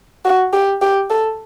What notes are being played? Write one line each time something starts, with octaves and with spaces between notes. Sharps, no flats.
F#4
G4
G4
A4